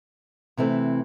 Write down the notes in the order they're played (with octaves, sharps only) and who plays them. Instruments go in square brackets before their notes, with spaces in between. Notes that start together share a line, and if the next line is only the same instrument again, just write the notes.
[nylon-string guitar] C3 E3 A3 C4